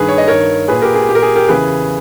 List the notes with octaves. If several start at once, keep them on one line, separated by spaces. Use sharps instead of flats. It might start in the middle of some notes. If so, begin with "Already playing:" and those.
Already playing: G2 D#3 G#4 B4
C#5
D#5
G2 D#3 A#4 C#5
A#2 G#4 B4
G4 A#4
G#4
A#2 G4
A#4
G#4
G4 A#4
E2 C#3 E3 G#4 B4